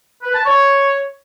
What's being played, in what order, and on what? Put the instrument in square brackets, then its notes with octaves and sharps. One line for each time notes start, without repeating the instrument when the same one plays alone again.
[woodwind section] B4
A5
C#5